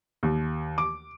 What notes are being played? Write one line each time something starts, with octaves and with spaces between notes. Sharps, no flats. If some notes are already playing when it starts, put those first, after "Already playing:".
D#2
D6